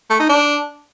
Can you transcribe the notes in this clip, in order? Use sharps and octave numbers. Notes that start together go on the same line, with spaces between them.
A3
D#4
D4